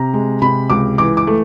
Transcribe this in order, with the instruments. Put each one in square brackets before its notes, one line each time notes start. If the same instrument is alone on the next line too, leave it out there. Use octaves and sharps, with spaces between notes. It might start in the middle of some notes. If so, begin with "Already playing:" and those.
Already playing: [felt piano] C3 A#5
G#3
C3 B5
C#2 D6
E3 D6
D6
A3